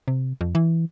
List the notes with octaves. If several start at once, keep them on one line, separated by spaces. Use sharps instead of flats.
C3
F2
E3